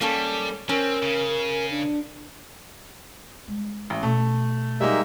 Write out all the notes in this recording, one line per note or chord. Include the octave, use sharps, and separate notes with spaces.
G3 A#3 C#4 A4
C4 C#4 A#4
C#3
D4
G3 G#3
A1
B2 A3
G3 G#3 A#3 D#4 E5